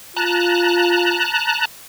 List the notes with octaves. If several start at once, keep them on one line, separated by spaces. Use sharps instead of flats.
F4 A5 A#5 F#6